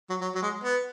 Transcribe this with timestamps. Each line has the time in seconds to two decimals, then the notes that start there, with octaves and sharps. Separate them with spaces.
0.10 F#3
0.21 F#3
0.35 F#3
0.42 G#3
0.64 B3